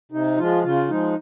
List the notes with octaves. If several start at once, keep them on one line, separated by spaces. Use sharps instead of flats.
C3 D#4
F3 G#3 F4
C#3 F4
F3 G#3 D#4